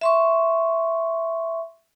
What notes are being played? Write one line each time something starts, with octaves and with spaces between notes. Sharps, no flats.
E5 C6 C#6